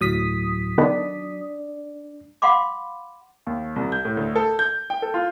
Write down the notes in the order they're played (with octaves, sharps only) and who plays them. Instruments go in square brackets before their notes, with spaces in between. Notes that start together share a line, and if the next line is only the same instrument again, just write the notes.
[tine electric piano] D2 A2 [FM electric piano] F#3 D#6 B6
[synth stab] D3 D#3 B3 [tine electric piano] D4 D5
[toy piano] F5 F#5 B5 C6 D6
[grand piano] D#2
C2
G6
A2
D2
A4
G6
G5
A4
F4